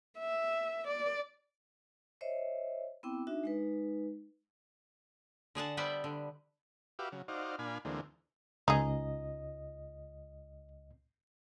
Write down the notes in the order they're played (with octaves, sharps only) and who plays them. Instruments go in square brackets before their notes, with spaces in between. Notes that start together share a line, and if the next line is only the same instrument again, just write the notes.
[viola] E5
D5
[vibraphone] C5 C#5 D#5 E5
B3 C4 E4 G5 D6
D4 D#4 F#4 E5
G#3 D#4 B4
[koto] D3 G#4 F#5 A5
G3 B3 B4 C5 D5 E5
D3
[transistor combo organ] F#4 G4 B4 E5 F5 D6
C#3 F#3
D#4 F#4 C5 D5 F5
A#2 D4 F5 G#5 B5
D2 D3 E3 G#3 A#3 C4
[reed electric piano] C#2 D#5 [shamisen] D#4 G#4